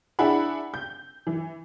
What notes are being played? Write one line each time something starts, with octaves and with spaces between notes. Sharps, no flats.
D4 E4 G#4 F#5 B5
G6
E3